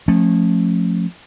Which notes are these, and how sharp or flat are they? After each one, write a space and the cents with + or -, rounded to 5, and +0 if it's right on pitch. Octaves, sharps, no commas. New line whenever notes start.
F3 +15 A3 +0 C#4 -25